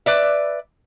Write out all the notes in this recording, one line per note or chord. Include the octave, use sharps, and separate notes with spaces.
B4 D5 E5